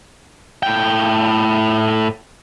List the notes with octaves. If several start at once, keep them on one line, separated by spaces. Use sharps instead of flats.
A2 G5